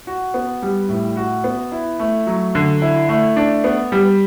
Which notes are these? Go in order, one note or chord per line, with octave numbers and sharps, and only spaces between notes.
F#4
B3
G3
A2
F#4
B3
E4
A3
F#3
D3
E4
A3
D4
B3
G3